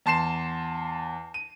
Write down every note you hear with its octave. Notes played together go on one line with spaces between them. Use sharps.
E2 A5 C6 C7 E7
D#7